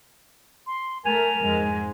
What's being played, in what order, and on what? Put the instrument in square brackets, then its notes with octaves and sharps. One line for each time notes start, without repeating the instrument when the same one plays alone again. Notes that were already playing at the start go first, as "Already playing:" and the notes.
[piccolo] C6
[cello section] A3 [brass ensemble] A#4 [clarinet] G#5 [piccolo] F7
[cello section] F2 G#2 G#3